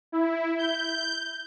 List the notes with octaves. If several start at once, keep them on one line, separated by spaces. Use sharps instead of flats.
E4
G6